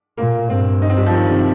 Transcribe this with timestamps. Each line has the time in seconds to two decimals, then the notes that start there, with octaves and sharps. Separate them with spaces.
0.17 A#2 A#3
0.49 G2 C4
0.82 D#4
0.90 C4
0.97 G3
1.06 F3
1.13 D#3
1.30 C3